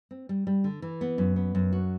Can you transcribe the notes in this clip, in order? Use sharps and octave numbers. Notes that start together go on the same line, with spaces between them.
C4
G3
G3
D3
E3
B3
F#2
B3
F#2
F#4